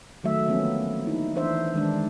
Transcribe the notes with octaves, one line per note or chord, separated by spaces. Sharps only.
D#3 F#3 A3 E5
D3 F3 A#3 B3 C#4
D#4 E4
E3 D4 C5 E5
D#3 G#3 D4